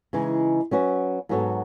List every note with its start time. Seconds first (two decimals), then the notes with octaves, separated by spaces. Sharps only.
0.13 C#3 E3 G#3 D#4
0.71 F#3 C#4 F#4 B4
1.29 G#2 F#3 B3 F#4 A4